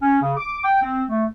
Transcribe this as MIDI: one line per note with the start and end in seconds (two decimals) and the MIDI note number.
0.02 0.18 61
0.22 0.32 49
0.37 0.59 86
0.63 0.81 79
0.82 1.03 60
1.09 1.25 57